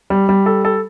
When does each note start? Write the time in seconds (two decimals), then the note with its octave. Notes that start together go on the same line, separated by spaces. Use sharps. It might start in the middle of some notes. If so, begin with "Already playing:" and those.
0.10 G3
0.29 G3
0.46 A4
0.65 A4